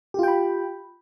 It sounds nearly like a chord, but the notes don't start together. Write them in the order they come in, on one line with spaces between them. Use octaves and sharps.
G4 F4 G5 B5